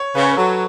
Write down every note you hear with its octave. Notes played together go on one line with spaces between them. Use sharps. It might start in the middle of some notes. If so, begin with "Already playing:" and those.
Already playing: C#5
C#3 B4
C#5
B4
F#3 A4